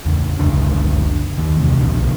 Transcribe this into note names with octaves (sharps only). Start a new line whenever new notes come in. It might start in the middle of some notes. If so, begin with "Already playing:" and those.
E2 C#3
F#1 C#2 D3 D4
D#2 D#3
E2 C3
B1 A#2 D3